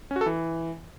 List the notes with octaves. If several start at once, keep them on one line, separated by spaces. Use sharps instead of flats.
C#4
F#4
A4
E3